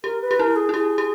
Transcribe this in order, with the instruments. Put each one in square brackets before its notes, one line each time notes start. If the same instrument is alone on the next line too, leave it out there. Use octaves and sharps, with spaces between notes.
[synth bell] G4 [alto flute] A#4
[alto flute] B4
[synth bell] G4
[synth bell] E4 [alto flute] A#4
[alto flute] G#4
[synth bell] E4
[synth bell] G4 [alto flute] G#4
[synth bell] G4